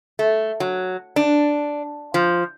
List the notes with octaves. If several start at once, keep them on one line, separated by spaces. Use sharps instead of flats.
A3
F#3
D4
F3